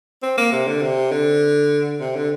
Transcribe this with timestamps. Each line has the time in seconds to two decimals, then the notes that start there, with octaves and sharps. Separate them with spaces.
0.22 C4
0.38 A#3
0.52 C3
0.68 D3
0.82 C3
1.12 D3
2.00 C3
2.16 D3